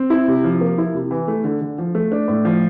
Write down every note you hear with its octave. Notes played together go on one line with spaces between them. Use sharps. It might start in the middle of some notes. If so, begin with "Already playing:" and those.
Already playing: C4
E4
C3
F3
A#3
E4
C3
E3
A3
D3
D3
F3
A3
D4
A2
F3